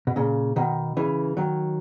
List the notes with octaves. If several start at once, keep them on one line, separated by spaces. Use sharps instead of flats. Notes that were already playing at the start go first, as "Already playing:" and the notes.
B2
A#2 C#3
B2 D#3
C#3 E3
D#3 F#3